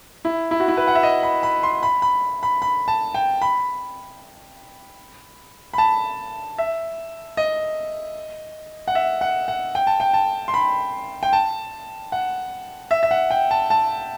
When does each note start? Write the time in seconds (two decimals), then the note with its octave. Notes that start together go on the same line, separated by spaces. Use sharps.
0.25 E4
0.51 E4
0.60 F#4
0.68 E4
0.77 B4
0.88 F#5
0.95 E5
1.03 D#5
1.23 B5
1.43 B5
1.63 C6
1.83 B5
2.02 B5
2.43 B5
2.62 B5
2.88 A5
3.14 G5
3.42 B5
5.74 B5
5.78 A5
6.58 E5
7.37 D#5
8.88 F#5
8.95 E5
9.21 F#5
9.48 F#5
9.75 G5
9.87 A5
10.00 G5
10.14 A5
10.48 C6
10.54 B5
11.23 G5
11.33 A5
12.12 F#5
12.91 E5
13.03 E5
13.11 F#5
13.31 G5
13.51 A5
13.70 A5